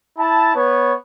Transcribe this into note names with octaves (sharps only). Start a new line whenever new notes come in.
E4 A5
B3 B4 C#5